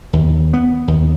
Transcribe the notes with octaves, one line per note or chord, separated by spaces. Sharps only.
D#2
B3
D#2